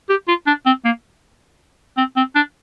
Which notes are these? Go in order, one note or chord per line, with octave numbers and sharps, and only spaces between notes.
G4
F4
D4
C4
A#3
C4
C4
D4